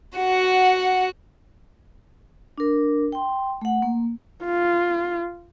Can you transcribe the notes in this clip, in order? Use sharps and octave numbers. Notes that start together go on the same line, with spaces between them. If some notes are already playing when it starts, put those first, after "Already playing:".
F#4 F#5
D4 A#4
G5 C6
A3 F#5
A#3
F4